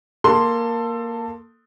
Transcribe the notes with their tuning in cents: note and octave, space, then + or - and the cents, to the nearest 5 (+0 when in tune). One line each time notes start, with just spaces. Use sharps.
A#3 +0 A4 +20 C6 +0